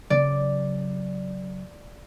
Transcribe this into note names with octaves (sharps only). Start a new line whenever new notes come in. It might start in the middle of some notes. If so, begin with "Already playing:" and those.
C#3 F#3 D5